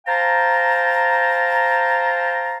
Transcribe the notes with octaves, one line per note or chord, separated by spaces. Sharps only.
C5 F5 G5 A5 A#5